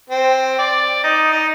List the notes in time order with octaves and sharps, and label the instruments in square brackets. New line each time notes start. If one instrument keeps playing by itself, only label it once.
[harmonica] C4
D5
D#4
D#4